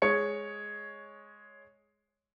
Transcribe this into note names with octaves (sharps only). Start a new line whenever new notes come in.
G#3 C#5 C#7